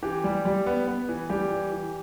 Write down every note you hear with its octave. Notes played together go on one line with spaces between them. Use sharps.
E3 G4
G3
G3
B3
B3
E3
G3 G4
E3
E3